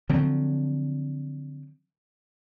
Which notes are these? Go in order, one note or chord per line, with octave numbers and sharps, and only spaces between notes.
D3 F3 F#3 C4